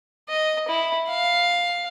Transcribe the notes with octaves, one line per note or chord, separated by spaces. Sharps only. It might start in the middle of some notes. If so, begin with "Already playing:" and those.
D#5
E4
F5